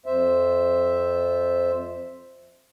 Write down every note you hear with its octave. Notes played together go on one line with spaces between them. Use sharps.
F2 C5 E5